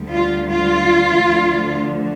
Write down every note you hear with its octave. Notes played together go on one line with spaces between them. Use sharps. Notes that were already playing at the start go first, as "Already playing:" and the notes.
Already playing: D2 D3 G3
F4
F4
D2 D3 F3 A3